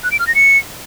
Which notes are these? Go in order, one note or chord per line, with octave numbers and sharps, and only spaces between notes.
F#6
D7
F6
A#6
C#7